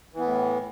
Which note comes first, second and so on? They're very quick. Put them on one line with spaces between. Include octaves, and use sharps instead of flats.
E3 B3 A2